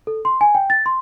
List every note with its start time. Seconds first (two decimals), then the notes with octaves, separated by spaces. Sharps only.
0.07 A4
0.25 C6
0.41 G#5
0.55 G5
0.70 A6
0.86 C6